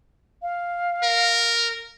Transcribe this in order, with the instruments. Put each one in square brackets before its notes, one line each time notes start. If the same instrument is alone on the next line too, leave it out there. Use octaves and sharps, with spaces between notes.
[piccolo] F5
[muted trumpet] A#4